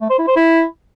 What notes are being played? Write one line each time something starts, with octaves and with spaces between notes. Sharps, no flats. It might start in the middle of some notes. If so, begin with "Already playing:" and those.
A3
C5
E4
C5
E4